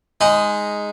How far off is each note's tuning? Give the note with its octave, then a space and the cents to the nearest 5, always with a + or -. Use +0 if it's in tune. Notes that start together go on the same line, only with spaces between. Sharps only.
G#3 +0 D#4 +0 B5 +45